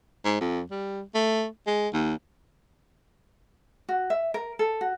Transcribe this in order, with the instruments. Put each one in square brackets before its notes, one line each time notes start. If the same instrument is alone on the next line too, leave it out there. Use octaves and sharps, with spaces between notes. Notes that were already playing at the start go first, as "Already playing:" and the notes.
[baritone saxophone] G#2
F2
G3
A3
G#3
D#2
[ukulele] F#4
E5
A#4
A4
F#4